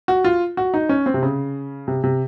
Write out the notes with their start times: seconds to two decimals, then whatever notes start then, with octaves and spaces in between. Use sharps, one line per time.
0.08 F#4
0.24 F4
0.57 F#4
0.74 D#4
0.89 C#4
1.06 C4
1.14 C3
1.23 C#3
1.88 C3
2.04 C3